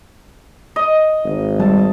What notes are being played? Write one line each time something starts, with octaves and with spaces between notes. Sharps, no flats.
D#5
G#1
G3 A5